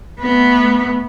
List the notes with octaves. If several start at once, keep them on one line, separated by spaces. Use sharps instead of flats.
A3 B3